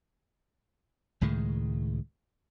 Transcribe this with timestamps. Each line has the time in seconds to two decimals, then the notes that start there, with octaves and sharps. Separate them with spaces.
1.21 C#2 A2 D#3 G#3